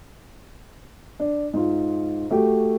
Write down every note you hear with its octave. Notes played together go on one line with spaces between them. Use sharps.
D4
G#2 F4
A3 F#4 G4